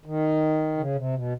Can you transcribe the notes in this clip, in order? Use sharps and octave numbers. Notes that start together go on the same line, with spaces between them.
D#3
C#3
C3
B2